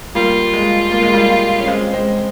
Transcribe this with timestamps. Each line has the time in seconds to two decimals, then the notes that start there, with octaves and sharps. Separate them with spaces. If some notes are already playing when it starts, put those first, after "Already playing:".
0.15 G3 A#3 F4
0.54 G#3
0.92 A#3
1.03 G#3
1.13 G3 A#3
1.59 C#4
1.68 G#3 C4
1.93 G#3 C4